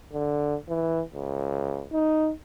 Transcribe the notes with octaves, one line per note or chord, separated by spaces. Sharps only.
D3
E3
C#2
D#4